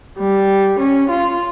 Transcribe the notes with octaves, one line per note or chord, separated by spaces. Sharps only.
G3
C#4
F4